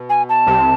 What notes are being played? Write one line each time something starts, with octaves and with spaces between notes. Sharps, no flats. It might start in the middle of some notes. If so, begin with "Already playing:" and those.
Already playing: B2
G#5
A5
C2 C3